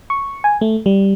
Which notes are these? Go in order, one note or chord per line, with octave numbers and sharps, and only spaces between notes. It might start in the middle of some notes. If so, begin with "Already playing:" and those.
C#6
G#5
A3
G3